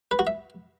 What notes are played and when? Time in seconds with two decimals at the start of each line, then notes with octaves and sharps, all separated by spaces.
0.11 B4
0.19 F#4
0.27 E5